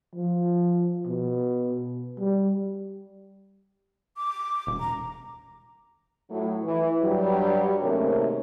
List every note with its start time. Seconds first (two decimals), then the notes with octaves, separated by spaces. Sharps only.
0.15 F3
1.07 B2
2.18 G3
4.17 D6
4.67 E1
4.80 A#5
6.30 A2 F#3
6.63 E3
7.01 G2 F#3 G3
7.81 D#2 G#2 C3 A3 C#4 A#4